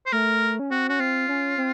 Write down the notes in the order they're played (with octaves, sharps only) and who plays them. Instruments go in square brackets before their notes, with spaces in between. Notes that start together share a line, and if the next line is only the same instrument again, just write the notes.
[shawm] C5
[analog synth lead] A3 [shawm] A#4
[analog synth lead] C#4
[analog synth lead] C4 [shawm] F#4
[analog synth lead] C#4 [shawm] F#4
[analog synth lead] C4 [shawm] F4
[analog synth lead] C#4
C4